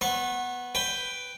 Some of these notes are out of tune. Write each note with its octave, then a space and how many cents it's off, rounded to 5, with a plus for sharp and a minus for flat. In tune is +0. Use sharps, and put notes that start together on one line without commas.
B3 +0 C#6 -35
B4 +5 G5 +0